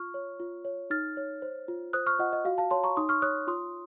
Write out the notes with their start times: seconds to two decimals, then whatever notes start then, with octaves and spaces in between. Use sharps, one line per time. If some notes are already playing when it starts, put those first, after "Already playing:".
Already playing: F4 C#6 F6
0.14 C#5
0.40 F4
0.65 C#5
0.90 D#4 F6 A6
1.17 C#5
1.42 C5
1.68 F4
1.93 C5 D#6 F#6
2.07 C#6 F6
2.19 F4 D#5 F#5
2.33 D#5
2.45 F#4 F5
2.58 F5 A5
2.71 C#5 A5 C6
2.84 A#5 C#6
2.96 D#4 C6 D#6
3.09 C#6 F6
3.22 C#5 D#6 F#6
3.47 F4 C6 D#6